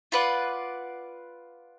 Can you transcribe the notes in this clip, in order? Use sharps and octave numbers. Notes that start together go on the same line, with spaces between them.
F4 B4 D5 F#5